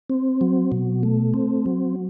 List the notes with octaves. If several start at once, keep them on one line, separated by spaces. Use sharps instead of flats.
C4
F#3
B2
A3
C4
F#3